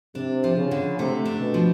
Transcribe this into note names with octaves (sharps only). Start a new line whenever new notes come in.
C3 D4
F3
C#3
D3
C3 A3
D4
B2
F3